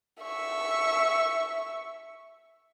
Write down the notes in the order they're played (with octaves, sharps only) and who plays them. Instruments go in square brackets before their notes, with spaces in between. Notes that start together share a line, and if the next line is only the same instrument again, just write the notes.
[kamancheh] E5 C#6